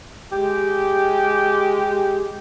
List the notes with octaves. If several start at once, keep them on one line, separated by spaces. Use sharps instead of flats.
G#3 G4